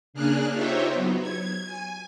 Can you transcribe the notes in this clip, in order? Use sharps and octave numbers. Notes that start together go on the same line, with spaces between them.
C#3 A#3 D4 G#4 F6 F#6
D#4 F4 G4 C5 C#5 E5
F#3 B3
G#6
G#5